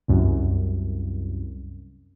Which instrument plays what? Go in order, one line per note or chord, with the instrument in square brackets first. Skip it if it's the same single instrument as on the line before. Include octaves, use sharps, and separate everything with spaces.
[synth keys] C2 F#2